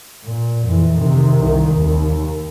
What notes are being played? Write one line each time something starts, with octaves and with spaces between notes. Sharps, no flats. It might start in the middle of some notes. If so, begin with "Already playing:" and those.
A#2
F2 E3
C3 D#3
C2 D#3
D#2